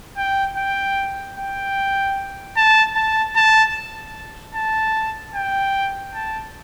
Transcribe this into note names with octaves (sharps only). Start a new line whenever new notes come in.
G5
G5
G5
A5
A5
A5
A5
G5
A5